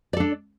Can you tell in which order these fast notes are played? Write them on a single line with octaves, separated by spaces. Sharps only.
D5 A4 D4